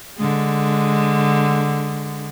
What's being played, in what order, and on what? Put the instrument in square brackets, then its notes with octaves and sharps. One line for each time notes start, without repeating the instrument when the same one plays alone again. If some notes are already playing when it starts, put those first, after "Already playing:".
[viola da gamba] D3 G#3